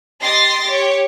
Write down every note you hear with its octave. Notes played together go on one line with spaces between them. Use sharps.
G4 D#5 C6 A6 A#6 C7
G4 C#5